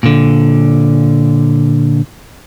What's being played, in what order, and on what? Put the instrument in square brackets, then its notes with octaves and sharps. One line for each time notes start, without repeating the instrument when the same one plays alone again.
[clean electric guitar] A#2 D3